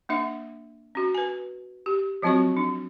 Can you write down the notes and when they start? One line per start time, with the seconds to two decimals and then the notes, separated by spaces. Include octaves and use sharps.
0.09 A#3 D4 E5
0.95 C#4 F#4
1.15 B4 G#5
1.86 G4
2.22 F3 F#3 C4 F4 F#4 C#6
2.57 D4